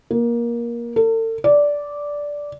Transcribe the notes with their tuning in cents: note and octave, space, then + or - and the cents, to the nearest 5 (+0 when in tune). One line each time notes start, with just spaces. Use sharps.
A#3 +20
A4 +40
D5 -10